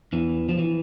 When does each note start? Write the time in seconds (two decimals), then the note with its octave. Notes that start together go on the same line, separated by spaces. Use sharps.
0.13 E2 E3
0.49 F3
0.59 E3